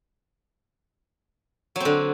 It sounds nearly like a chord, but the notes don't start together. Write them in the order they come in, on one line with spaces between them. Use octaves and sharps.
F#3 C4 D3